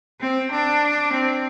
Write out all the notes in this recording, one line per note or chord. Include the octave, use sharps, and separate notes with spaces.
C4
D4
C4